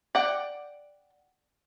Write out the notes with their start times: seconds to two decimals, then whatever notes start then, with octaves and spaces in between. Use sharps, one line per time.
0.15 D5 F#5 G5